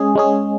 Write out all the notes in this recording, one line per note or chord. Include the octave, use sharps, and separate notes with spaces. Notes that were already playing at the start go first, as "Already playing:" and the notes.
Already playing: G#3 C#4 G#4
G#3 C#4 G#4